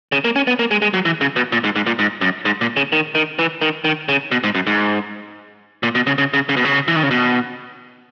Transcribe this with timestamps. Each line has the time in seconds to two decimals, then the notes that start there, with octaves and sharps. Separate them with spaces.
0.12 C#3
0.25 A#3
0.36 C#4
0.47 B3
0.59 A#3
0.71 G#3
0.82 G#3
0.94 F#3
1.05 E3
1.21 C#3
1.36 B2
1.52 A#2
1.64 G#2
1.76 G#2
1.87 A#2
1.99 G#2
2.21 F#2
2.45 G#2
2.61 A#2
2.77 C#3
2.92 D#3
3.15 D#3
3.39 E3
3.61 D#3
3.84 D#3
4.09 C#3
4.31 B2
4.44 G#2
4.55 F#2
4.67 G#2
5.83 A#2
5.95 B2
6.07 C#3
6.18 C#3
6.34 C#3
6.49 C#3
6.57 B2
6.65 C#3
6.88 E3
6.96 D#3
7.03 C#3
7.11 B2